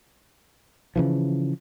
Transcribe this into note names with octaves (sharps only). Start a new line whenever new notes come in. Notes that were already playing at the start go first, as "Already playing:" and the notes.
C#3 E3 F3